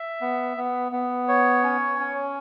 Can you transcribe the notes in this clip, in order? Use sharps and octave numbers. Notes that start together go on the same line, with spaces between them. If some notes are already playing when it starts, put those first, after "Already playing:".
Already playing: E5
B3
B3
B3
C#5
C#4
C#4